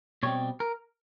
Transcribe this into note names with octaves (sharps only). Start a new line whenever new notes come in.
B2 G3 C4 C#5
A#4